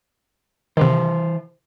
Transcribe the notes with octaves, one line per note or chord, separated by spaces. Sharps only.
C3 D#3 E3 C5